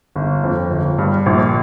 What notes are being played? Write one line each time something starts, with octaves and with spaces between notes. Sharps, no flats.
G1
F2
G1
G2
A#1